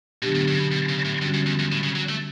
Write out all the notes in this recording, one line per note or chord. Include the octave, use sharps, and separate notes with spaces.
B2 D3 F#3 B3 D4 G4
A2
G2
C#3
B2
B2
C#3
A2
G2 D3 G3 C#4 F#4
F#2
E2
E2
A2
C#3
F#3
A3